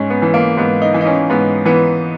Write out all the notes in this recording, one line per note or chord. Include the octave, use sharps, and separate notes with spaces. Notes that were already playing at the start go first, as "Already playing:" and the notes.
Already playing: G#2 C#4
B3
E3
A#3
G#2 B3
D#4
E3
D#4
C#4
G#2 B3
E3 B3